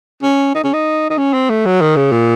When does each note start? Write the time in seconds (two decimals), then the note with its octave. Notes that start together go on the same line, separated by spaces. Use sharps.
0.23 C#4
0.55 D#4
0.64 C#4
0.73 D#4
1.10 D#4
1.18 C#4
1.33 C4
1.50 A3
1.66 F#3
1.81 D#3
1.96 C#3
2.12 A#2